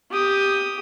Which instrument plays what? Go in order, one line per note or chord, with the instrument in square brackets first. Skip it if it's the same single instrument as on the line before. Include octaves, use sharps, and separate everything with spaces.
[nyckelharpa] G4 D#6